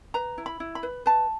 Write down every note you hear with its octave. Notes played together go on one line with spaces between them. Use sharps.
B4 A#5
E4
B5
E4
B5
B4
B4 A5